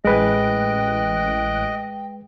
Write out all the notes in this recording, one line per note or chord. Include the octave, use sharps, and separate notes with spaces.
A1 G#3 B4 D#5 G5 F#6 D7